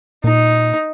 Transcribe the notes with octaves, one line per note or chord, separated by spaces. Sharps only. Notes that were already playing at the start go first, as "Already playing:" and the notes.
A#2 D#4